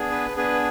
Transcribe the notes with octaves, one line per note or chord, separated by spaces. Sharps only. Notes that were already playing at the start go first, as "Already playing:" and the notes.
Already playing: B3 D4 G#4
B4
B3 D4 G#4 B4